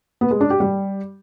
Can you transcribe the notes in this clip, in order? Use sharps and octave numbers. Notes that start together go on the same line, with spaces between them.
B3
G#3
D4
G4
G3